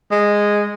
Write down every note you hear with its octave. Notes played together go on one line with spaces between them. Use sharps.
G#3